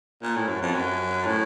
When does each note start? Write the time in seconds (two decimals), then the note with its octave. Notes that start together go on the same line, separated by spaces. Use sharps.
0.23 A#2
0.36 A2
0.48 F#2
0.62 F2
0.75 F#2
1.26 A2